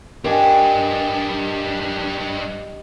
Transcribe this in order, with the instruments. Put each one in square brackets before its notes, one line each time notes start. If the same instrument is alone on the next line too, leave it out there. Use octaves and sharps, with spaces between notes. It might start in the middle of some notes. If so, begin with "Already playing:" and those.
[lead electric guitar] G3 D4 [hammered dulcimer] G4 D#5 G#5 [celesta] A#4